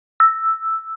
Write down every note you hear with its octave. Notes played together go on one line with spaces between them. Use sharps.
E6